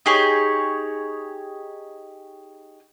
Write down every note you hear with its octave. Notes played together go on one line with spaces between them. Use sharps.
D#4 G4 G#4 C#5